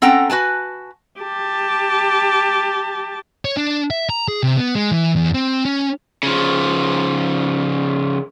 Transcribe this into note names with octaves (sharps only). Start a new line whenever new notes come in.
C4 C#4 A4 F#5 G5 A#5
F#4 B4 G#5 A5
G4 A5
C#5
D4
E5
A#5
G#4
C3
B3
G#3
E3
E2
C4
C#4
C#3 F3